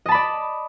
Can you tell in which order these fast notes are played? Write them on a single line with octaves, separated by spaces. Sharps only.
D#5 A5 B5 D5